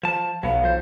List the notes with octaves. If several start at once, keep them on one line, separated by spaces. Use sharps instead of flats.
F3 A5
B1 F#3 B3 F5
F3 C5